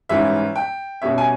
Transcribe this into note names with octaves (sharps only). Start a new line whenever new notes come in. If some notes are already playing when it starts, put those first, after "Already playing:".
G#2 E3 G3 C#4 E5
G5
B2 G3 C#4 E5
G#5